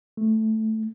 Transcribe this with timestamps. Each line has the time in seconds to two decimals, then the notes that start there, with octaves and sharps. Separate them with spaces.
0.17 A3